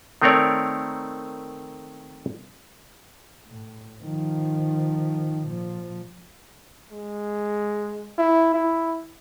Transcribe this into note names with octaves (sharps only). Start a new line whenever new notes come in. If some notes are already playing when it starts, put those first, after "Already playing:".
D#3 A3 C4 A#4 C#5 D5
A2
D#3 F3
A#2 F3
G#3
E4
E4